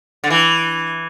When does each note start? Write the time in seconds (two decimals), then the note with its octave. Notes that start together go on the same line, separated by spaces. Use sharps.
0.24 D3
0.30 E3